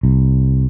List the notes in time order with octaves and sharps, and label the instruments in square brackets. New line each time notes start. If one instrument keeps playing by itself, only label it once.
[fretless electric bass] C2